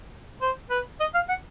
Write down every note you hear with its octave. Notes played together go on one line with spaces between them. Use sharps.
C5
B4
D#5
F5
F#5